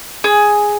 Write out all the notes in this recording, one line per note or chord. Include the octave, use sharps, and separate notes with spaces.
G#4